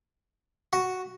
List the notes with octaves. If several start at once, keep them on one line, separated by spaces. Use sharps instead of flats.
F#4